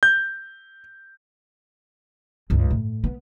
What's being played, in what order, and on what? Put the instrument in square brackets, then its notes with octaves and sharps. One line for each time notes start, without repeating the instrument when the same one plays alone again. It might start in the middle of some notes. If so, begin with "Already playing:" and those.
[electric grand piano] G6
[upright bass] C#2 G2
A2
B3